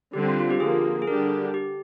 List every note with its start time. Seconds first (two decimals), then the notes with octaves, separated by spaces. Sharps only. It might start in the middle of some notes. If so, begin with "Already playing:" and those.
0.13 D3 G3 C4 G4
0.28 F4
0.40 F4
0.51 G4
0.60 D3 F3 A#3 G#4
1.02 G#4
1.07 D3 G3 D4 G4 A#4
1.54 G4